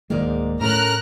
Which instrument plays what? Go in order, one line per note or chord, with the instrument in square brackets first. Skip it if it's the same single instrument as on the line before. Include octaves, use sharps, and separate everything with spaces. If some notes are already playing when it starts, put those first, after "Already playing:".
[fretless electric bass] D1 D#3 G#3 [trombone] G#2 [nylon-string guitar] A#3 A#4 D5
[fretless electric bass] A2 [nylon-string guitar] A3 C#4 A4 [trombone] A#4 [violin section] A#5 F6 F#6